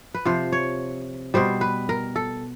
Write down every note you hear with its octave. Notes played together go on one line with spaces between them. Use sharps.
B4
C3 F3 C5
C#5
B2 G3 C5
B4
A#4
A4